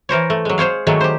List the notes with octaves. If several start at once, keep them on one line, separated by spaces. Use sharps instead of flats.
E3 A#4 C5 C#5
A3
F#3 G#3
G#4 C5 C#5 F5
D#3 F#3 G#3 A3 C#5
G4 C5